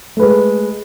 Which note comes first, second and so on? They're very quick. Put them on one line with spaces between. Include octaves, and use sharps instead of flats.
A3 B4 G#3